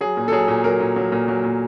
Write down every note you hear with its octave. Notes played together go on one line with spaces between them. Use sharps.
F#3 G#4
A#2
A4
F#3 G#4
A#2
F#3 A#4
A#2
F#3
A#2
F#3
A#2